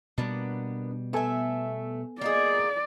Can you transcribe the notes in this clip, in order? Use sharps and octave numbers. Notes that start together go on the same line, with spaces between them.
B2 G3 A#3 B3 D4
A3 B3 A4 E5 G#5
A#3 D#4 G#4 D5